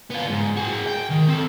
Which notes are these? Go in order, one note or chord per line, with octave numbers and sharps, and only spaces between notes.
B3 F4
G#2
F#4 G#4
G5
D#3
C4 A4